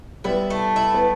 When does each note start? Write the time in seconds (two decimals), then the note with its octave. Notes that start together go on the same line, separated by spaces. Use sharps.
0.24 G3 B3 E4
0.50 A3
0.76 E4
0.94 B3